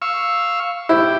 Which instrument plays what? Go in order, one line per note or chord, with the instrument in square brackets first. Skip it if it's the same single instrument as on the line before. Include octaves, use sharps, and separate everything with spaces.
[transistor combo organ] F5 C#6 E6
[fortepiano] E4 [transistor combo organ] G4